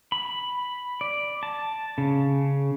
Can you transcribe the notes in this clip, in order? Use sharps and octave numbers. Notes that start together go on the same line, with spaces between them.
B5
D5
A5
C#3